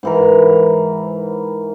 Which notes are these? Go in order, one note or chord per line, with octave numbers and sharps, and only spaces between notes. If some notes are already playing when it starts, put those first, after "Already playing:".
G#2 E3 A#4